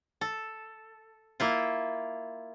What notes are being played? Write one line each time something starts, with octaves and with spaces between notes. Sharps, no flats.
A4
A#3 E4 F4